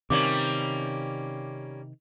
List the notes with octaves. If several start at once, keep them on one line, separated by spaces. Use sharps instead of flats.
C3 D#3 G3 A#3 C#4 D6